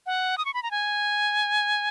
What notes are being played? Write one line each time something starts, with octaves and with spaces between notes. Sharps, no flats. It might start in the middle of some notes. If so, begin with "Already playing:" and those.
F#5
D#6
C#6
B5
A#5
G#5